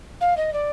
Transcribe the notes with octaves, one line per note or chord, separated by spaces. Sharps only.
F5
D#5
D5